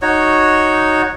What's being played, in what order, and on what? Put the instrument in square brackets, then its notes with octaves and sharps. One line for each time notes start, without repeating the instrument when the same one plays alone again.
[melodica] D#4 F#4 C#5